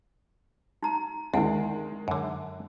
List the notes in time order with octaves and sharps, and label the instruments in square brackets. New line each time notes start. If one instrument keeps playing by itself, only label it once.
[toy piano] D#4 A#5
[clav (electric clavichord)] D2 [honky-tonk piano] D#3 G#3 [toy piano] E4 F#5 G#5
[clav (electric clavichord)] F#2 D3